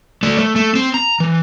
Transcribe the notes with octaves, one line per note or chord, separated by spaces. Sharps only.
A3 D5
A3
A3
C4
A#5
E3